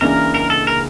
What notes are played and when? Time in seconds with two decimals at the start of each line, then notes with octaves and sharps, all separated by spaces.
0.01 C#2 C#3 E3 A#3 D4 A#4
0.34 A#4
0.50 A4
0.67 A#4